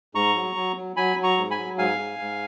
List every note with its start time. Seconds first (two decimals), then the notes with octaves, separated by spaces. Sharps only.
0.15 G#2 A#5 C#6
0.35 F#3
0.56 F#3
0.76 F#3
0.96 F#3 G#5 B5
1.17 F#3
1.23 A#5 C#6
1.37 G#2
1.51 G#5 B5
1.58 F#3
1.78 G#2 F5 G#5
1.98 G#2
2.19 G#2